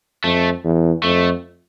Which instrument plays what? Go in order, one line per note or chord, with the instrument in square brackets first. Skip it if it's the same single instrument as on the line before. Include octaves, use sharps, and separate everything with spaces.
[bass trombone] F2 [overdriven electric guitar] A3
[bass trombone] E2
[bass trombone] F2 [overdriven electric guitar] A3